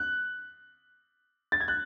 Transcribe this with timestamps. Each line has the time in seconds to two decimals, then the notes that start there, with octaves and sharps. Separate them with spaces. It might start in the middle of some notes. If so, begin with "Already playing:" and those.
Already playing: F#6
1.52 A6
1.60 G#6
1.68 F#6